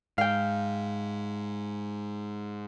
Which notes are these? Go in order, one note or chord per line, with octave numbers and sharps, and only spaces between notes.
G#2 F5 G5